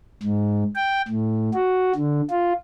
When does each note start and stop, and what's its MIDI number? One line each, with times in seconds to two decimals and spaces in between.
0.23 0.63 44
0.75 1.02 79
1.08 1.50 45
1.54 1.92 66
1.95 2.21 50
2.30 2.53 65